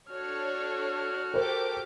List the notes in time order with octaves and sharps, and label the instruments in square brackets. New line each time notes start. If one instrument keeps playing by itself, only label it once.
[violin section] D4 A4 C#5 [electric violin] F#4 F6
[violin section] G4 A4 D6 [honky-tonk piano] A#4 C5